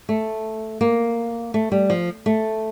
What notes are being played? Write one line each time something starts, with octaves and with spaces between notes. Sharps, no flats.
A3
A#3
A3
G3
F3
A3